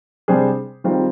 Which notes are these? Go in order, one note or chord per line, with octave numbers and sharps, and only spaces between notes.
C3 G3 D4 G#4 C5
D#3 G3 C4 F4 G#4